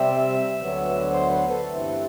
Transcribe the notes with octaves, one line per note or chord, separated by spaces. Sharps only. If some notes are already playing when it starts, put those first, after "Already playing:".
Already playing: C3 G3 C4 E5
D2 D3 F#3 B3
C5
B4
A4
G2 E3 A3 C4